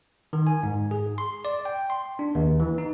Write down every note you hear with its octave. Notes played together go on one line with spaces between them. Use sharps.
D#3
G#5
G#2
G#4
C6
D5
G5
C6
D4
D#2
E3
D#4